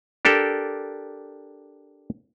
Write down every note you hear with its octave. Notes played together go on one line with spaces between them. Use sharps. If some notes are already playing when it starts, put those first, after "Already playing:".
D4 G4 A4 A#4